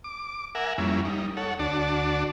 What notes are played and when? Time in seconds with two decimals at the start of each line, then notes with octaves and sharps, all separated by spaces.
0.04 D6
0.55 A#4 E5 F#5 G#5
0.78 F2 G3 A#3 C#4 E4
1.05 G3 D#4
1.37 A4 C#5 F#5
1.59 D2 D4 F#4 D5 A5